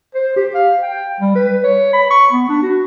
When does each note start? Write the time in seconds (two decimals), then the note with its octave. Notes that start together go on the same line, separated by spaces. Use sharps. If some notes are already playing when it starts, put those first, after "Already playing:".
0.15 C5
0.36 G4
0.55 F5
0.82 G5
1.20 G3
1.35 B4
1.64 C#5
1.93 B5
2.11 C#6
2.32 B3
2.49 D4
2.62 F#4